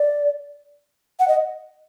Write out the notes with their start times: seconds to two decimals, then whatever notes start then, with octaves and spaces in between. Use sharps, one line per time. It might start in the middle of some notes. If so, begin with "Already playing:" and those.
Already playing: D5
1.20 F#5
1.28 D#5